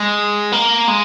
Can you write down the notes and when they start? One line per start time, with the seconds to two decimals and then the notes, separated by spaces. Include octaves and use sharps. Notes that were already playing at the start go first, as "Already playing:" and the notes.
Already playing: G#3
0.52 A#3
0.88 G#3